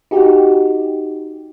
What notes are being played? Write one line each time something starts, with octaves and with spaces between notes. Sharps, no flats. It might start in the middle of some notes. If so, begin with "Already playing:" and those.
D#4 F#4 G4